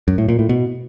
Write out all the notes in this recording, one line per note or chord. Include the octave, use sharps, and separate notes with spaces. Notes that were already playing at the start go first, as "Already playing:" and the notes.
F#2
A2
A#2
A2
B2